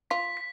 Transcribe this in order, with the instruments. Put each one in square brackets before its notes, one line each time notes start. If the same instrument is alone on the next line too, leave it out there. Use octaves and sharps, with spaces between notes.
[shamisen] F4 [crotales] B6
[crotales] B6